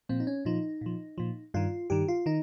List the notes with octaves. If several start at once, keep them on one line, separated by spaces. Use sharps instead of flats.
A#2 F3 C4
D#4
C#4
A#2 F3 D#4
A#2 F3
A#2 F3
G2 D#3 F4
G2 D#3 G4
F4
D#3 D#4